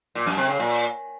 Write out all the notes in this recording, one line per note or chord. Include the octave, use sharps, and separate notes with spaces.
A#2
F#2
C3
C#3
A#2